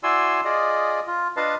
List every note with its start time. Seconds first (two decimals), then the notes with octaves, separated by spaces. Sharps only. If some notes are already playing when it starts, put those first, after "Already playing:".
0.03 E4 F#4 D5 G#5 C6 E6
0.45 F4 G#4 D5 D#5
1.07 F4
1.37 D4 F4 B4 D#5 F5 A5